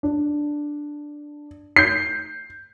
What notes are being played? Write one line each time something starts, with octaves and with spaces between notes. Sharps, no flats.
D4
G6 C7